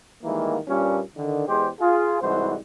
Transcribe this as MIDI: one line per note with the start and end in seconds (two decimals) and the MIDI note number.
0.23 0.56 51
0.23 0.56 52
0.23 0.56 55
0.23 0.56 56
0.23 0.56 58
0.68 0.99 43
0.68 0.99 46
0.68 0.99 61
1.16 1.45 50
1.16 1.45 51
1.47 1.68 40
1.47 1.68 56
1.47 1.68 67
1.47 1.68 72
1.80 2.20 65
1.80 2.20 68
2.21 2.55 36
2.21 2.55 44
2.21 2.55 52
2.21 2.55 55
2.21 2.55 66
2.21 2.55 72